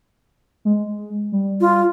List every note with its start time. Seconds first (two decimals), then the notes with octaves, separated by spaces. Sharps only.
0.65 G#3
1.32 G3
1.61 F4